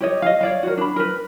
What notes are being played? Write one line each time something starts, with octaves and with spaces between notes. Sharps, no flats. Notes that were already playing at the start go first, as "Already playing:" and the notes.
G4 C#5 D#5
D#5 F5
C#5 D5 F5
F#4 A#4
D4 B5
A#4 B4